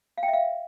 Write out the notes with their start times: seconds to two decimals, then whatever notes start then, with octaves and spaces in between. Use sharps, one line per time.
0.18 F5
0.23 G5
0.28 E5
0.33 F5